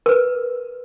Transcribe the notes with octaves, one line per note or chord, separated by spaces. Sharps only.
A#4 B4